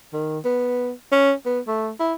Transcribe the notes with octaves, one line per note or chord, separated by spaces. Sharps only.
D#3
B3
C#4
B3
A3
E4